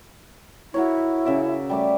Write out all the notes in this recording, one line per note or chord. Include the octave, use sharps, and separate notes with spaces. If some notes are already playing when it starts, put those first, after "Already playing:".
E4 F#4 A#4 C#5
C#3 E5 D6
G3 A3 D6